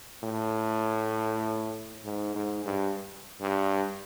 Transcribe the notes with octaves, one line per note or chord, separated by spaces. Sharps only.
A2
G#2
G#2
G2
G2